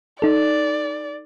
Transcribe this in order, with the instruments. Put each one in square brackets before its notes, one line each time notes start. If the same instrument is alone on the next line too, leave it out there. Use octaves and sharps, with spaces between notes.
[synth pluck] D#4 A4 [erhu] D5